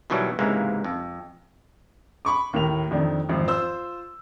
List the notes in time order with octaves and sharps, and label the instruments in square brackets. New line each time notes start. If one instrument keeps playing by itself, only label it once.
[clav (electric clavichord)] B2 D#3 E3 F#3 G3
C#2 G#2 C3 E3 G#3 A#3
F2
[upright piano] B5 C#6 D6
D#2 A2 A#4 F7
F2 D#3 A3 D4
G#1 F2
F4 C5 E6